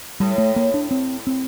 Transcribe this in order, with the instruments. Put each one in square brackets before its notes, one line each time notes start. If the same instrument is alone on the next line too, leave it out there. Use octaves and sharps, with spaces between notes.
[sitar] A2 [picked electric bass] G3
[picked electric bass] A3
A#3
D4
C4
C4